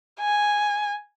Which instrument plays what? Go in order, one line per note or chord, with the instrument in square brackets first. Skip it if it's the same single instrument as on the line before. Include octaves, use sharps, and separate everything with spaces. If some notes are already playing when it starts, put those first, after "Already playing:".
[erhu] G#5